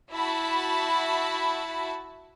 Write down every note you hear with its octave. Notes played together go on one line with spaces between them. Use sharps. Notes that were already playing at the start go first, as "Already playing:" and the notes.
E4 F#4 E5 A5 B5